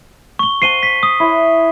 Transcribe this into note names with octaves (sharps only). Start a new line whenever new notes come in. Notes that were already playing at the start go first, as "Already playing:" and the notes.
C#6 G7
C5 F#5 A5 C7 D#7 G7
B6
D#6
E4 C#5 C6